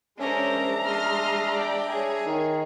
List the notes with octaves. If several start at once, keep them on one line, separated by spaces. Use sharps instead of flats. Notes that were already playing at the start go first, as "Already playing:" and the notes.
G#3 C#4 D4 A#4 C5 E5 A#5
C6 D#6 F6
D5 G5
G#4 C#5
D#3